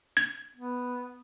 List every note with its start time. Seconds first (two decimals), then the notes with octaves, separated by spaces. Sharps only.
0.17 G#6
0.55 B3